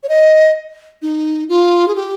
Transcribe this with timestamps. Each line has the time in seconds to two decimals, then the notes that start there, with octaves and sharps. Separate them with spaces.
0.03 C#5
0.09 D#5
1.02 D#4
1.49 F4
1.88 G#4
1.95 G4